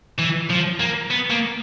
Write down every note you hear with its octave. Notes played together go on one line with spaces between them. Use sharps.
E3
F3
A#3
B3
A#3